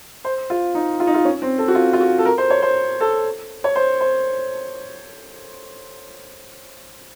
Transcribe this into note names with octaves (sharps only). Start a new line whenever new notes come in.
C5
F4
D#4
F4
D#4
F4
C#4
C4
A4
F#4
F4
F4
F#4
A4
A#4
C5
C#5
C5
A4
C#5
C5
C5